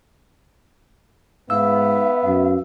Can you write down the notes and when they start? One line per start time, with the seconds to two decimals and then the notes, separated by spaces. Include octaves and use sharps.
1.50 G#2 B3 E5 F5 E6
2.25 F#2